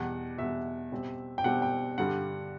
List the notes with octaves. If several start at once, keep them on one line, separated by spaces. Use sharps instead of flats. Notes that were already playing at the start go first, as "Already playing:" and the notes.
Already playing: E2 B2 G3 F#5
E2 B2 G3 E5
B2 G3 C4
G5
B2 G3 C4 F#5
G5
G2 D3 G3 F#5